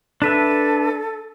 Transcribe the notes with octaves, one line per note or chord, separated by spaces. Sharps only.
D4 A4 B4 E5